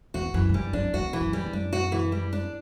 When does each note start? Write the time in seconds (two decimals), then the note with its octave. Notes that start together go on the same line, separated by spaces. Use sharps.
0.14 E2 F#4
0.34 F#2 E3
0.49 A2
0.54 G2 G3
0.73 F#2 D4
0.93 E2 F#4
1.13 E3
1.21 F#2
1.33 G3
1.46 F#2
1.53 D4
1.73 F#4
1.92 E3
2.12 G3
2.33 D4